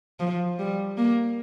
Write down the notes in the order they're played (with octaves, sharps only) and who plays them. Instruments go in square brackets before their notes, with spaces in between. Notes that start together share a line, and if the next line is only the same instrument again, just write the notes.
[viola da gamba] F3
G3
A#3